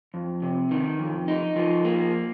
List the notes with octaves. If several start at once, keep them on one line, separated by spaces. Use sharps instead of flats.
F2
C3
D#3
F2
D#4
F3
A#3